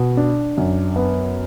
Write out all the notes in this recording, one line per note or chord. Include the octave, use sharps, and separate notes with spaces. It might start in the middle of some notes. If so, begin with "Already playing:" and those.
Already playing: B2
D4
F#2
B3